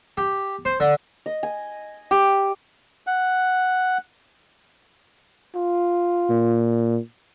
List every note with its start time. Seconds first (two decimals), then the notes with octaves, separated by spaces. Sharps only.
0.17 G4
0.65 C5
0.80 D3
1.26 D#5
1.43 G#5
2.11 G4
3.07 F#5
5.56 F4
6.30 A#2